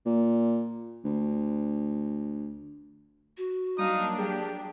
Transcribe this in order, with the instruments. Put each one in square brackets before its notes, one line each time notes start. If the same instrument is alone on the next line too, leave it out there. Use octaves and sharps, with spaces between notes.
[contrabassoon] A#2
D2
[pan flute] F#4
[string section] F#3 A#3 D4 [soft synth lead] G3 [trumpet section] D#4 F5 D#6
[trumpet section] G4 [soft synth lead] G#4 [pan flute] G5